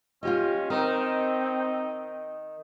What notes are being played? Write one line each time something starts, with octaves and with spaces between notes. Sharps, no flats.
C#4 F4 G4 D#5
D#3 C4 D#4 A#4